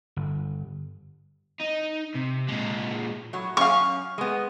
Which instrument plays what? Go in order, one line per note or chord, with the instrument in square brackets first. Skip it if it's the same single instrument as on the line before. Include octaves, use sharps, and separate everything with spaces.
[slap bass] G1
[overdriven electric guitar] D#4
C3
A#2 G#3
[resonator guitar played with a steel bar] A2 F#3
[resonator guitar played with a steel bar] F#2 C#4 F5 [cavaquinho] C#6
[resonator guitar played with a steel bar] G#3 B3